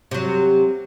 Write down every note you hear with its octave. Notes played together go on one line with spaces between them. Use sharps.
C3 F#3